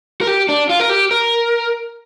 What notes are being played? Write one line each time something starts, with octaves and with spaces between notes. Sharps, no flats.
A#4
G4
D4
F4
A#4
G4
A#4